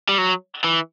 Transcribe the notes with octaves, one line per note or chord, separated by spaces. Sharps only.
G3
F#3
E3